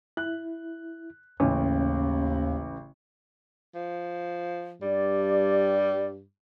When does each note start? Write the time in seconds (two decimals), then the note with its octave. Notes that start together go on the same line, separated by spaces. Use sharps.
0.17 E4 F#6
1.40 A1 D#2 C#3 C#4
3.75 F3
4.82 G2 G3 D5